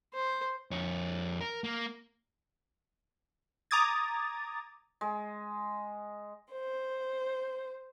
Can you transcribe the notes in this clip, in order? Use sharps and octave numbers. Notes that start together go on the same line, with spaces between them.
C5
F2 C#5
A#4
A#3
A#5 D6 D#6 G#6 A6
G#3
C5